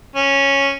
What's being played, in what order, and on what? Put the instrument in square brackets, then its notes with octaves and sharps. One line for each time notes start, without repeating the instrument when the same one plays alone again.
[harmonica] C#4